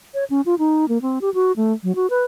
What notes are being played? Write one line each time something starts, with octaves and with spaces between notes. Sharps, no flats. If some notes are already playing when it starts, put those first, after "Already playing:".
C#5
C#4
F4
D#4
A#3
C4
G4
F#4
A3
F#3
F#4
B4